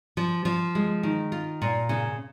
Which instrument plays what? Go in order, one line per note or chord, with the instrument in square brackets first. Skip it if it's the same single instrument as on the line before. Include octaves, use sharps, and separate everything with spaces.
[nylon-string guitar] F3
F3
G#3
D#3
F4
A#2
C#3